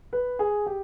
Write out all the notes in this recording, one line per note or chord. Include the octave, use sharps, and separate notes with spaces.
B4
G#4
G4